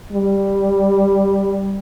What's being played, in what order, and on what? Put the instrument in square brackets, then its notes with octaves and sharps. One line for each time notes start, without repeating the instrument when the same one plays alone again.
[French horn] G3